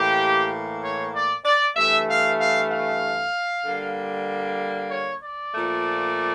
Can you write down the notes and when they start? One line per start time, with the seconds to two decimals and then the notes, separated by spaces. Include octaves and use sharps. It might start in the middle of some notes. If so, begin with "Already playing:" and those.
Already playing: A2 E3 A#3 G4
0.82 C#5
1.14 D5
1.45 D5
1.76 G2 E3 A3 E5
2.08 F5
2.39 F5
2.70 F5
3.64 D3 G3 A#3
4.91 C#5
5.22 D5
5.53 A#2 F3 A3